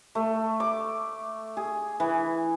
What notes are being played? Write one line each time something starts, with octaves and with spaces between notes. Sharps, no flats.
A3
D6
G#4
E3